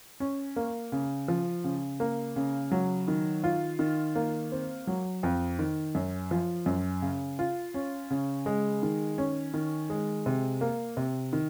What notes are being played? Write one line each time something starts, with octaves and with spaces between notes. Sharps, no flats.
C#4
A#3
C#3
F3
C#3
A#3
C#3
F#3
D#3
F4
D#3
A#3
C4
F#3
F2
D#3
F#2
F3
F#2
C#3
F4
C#4
C#3
G#3
D#3
C#4
D#3
G#3
C3
A#3
C3
D#3